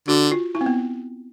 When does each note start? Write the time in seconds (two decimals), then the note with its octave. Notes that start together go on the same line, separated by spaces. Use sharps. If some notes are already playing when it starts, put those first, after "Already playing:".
0.08 D3 F#4
0.31 F4
0.55 E4
0.61 C4
0.66 B3